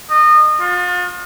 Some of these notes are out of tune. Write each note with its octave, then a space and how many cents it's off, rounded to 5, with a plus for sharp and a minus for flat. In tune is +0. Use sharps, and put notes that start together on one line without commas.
D#5 -30
F4 +40